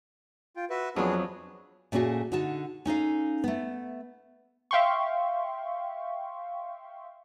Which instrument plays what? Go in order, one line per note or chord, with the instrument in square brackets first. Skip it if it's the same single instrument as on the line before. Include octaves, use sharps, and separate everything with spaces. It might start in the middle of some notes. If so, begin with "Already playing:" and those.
[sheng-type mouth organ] F4 G5
F#4 B4 E5
[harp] F2 F#3 [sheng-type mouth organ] B3 D4 G#4
[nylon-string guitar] A#2 A3 C#4 E4 F#4 G#4
D3 D#4 F#4 A5
C#4 D#4 A4 F5
A3 B3
[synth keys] E5 F5 G5 C6 C#6